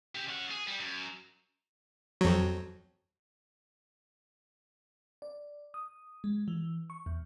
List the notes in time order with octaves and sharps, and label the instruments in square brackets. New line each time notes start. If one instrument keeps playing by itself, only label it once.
[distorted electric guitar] C#3 G4
C#4 F#5
G#4
G3
F#2
[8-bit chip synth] F2 F#3
[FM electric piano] D5
D#6
G#3
E3
C#6
E2